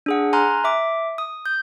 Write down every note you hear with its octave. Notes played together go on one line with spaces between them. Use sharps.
D4 G#4 F#5
G#5 A#5 C6 F6 F#6
E5 D6
D#6
G6